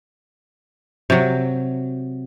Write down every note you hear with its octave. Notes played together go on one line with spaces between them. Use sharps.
C3 F#3